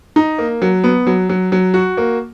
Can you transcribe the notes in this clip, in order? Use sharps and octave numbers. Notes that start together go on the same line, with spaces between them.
D#4
A#3
F#3
B3
F#3
F#3
F#3
F#4
A#3